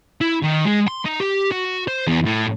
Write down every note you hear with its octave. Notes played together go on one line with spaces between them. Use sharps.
E4
D#3
G#3
C6
D#4
G4
F#4
C5
E2
A2